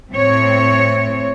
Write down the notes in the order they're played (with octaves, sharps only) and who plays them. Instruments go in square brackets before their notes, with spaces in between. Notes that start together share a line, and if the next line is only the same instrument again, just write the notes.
[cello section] A2 C4 C#5